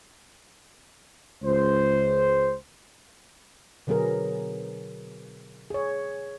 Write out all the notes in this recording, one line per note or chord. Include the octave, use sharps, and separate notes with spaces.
C#2 C5
B2 D3 F#3 B3 G#4 A#4
G#4 C#5